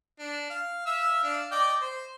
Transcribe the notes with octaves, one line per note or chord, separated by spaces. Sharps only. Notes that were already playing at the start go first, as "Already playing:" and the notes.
D4
F5
E5 F5 E6
D4 F5
D5 D#5 G5
C5